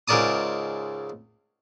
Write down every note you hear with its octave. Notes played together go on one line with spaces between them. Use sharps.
C#2 G#2 A#4 D5 A5 D#6